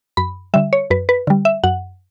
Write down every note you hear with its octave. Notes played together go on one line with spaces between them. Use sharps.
F#2 B5
D3 G3 E5
C#5
F#2 B4
B4
D3 G3
E5
F#2 F#5